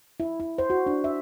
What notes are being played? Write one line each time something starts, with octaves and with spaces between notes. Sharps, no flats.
E4
E4
C5
F#4
D4
E5